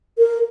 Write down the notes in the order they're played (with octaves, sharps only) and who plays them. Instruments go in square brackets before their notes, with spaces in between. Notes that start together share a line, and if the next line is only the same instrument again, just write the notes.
[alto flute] A#4